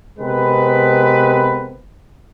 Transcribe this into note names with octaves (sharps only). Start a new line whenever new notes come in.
C3 G#3 B3 C4 A#4 B4